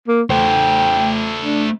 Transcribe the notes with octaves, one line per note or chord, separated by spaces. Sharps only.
A#3
A3 C5 G5
D4